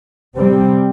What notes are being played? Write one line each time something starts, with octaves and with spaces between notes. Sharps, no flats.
C3 G3 C4